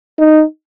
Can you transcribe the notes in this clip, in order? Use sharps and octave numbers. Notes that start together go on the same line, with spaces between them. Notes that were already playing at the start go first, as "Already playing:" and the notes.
D#4